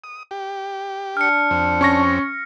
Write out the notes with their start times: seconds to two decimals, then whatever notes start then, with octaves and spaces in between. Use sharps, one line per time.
0.04 D#6
0.31 G4
1.17 D4 F6 C#7
1.51 F2 C4
1.81 C#4 C#6 A#6